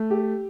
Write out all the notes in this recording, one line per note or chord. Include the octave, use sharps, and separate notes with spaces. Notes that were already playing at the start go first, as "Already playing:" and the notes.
Already playing: A3
G4